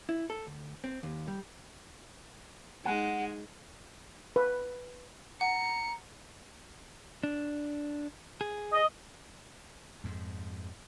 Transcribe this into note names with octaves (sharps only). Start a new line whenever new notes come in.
E4
A4
D2
C4
D#2
G3
G#3 D#4 F#5
B4
F#5 A#5 C#7
D4
G#4
D#5
F2 G#2